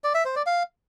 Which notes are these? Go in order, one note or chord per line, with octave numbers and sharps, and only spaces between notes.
D5
E5
C5
D5
F5